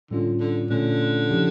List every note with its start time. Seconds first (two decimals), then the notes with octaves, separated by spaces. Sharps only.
0.11 A2 D3 G3 C#4 F4
0.40 D3
0.70 A#2 D3 A3 C#4 F4
1.30 C#3 F3 C#4 E4 G4